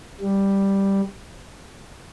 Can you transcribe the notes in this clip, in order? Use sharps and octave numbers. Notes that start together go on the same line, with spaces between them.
G3